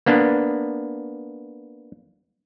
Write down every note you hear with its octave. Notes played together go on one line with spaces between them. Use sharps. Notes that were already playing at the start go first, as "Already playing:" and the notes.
A#3 B3 D4